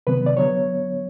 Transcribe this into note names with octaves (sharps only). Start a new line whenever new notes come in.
C3 D#3 F#3 B3 B4
D5
D3 F#3 B3 C#5